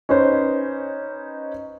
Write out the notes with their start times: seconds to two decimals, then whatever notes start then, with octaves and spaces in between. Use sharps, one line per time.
0.09 C#4 D#4 B4 C5